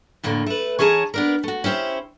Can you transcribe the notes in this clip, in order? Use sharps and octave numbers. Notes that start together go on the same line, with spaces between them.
F2 A2 D3 A#3
A3 B4
E3 C#4 G#4 C#5 A5 A#5
B3 D4 A#4
A3 F#4
C#4 E4 G4 C5